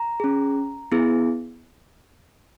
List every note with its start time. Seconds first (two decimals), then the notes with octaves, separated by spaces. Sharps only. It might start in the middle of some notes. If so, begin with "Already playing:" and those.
Already playing: A#5
0.20 C#4 G#4
0.92 B3 E4 G#4